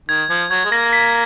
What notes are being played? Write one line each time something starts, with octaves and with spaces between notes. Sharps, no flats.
D#3 G#6
F3 G#6
F#3 G#6
G#3
A#3 A#6
B6